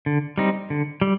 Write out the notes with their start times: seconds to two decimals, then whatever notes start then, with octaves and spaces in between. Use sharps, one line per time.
0.06 D3
0.38 G3 C4 D#4
0.70 D3
1.01 G3